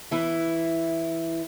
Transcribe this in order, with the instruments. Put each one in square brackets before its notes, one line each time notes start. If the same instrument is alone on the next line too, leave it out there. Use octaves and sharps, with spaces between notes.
[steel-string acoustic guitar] E3 E4